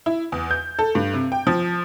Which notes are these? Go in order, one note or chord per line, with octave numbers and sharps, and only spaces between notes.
E4
E2
G6
A4
G2
C3
G5
F3